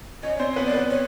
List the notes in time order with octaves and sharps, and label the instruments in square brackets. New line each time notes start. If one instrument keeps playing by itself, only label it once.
[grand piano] C#4 C#5 [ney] D#5
[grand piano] C4 C5 [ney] D5
[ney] C#5
[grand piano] B3 B4
[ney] D5
[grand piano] B3 B4
[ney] C#5